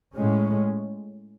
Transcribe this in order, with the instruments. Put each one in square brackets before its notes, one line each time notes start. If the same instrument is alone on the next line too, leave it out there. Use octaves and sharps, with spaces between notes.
[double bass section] A2 G#3 C#4